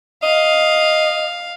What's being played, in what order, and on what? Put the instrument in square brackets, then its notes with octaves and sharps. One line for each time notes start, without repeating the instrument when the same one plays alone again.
[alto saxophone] D#5 [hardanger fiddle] F5